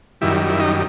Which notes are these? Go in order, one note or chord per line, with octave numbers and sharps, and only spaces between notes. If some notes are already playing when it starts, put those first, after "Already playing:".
F#2 D#3 G3 E4
E4
D#4